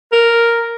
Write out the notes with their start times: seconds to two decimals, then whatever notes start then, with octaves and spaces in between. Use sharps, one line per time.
0.12 A#4